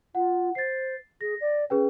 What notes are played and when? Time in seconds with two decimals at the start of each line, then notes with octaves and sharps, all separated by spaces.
0.15 F4 F#5
0.55 C5 A6 C7
1.21 G#4 A#6
1.40 D5
1.70 C#4 G#4 B4 G5